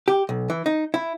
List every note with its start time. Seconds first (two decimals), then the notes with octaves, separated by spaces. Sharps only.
0.08 G4
0.29 B1
0.50 E3
0.66 D#4
0.94 E4